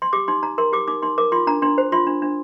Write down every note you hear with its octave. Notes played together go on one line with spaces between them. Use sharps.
C6
G4 D6
D#4 C6
D#4 A#5
A#4 C6
G4 D6
D#4 D6
D#4 C6
A#4 D6
F4 C6
D4 A#5
D4 C6
C5
F4 C6
D4
D4